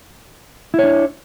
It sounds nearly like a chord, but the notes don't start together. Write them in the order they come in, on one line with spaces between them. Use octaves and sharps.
E4 C#5 D4